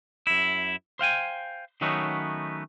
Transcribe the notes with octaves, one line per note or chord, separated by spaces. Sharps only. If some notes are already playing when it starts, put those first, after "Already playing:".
F#2 E4
C5 F5 G5 G#5
D#3 F#3 A3 B3 C#4 D#4